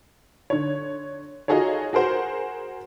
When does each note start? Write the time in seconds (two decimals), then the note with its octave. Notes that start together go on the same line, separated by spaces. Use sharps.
0.50 D3 C#5
1.48 D#4 F4 F#4 G#4 A4 C#5
1.93 F#4 G#4 A#4 C5 F#5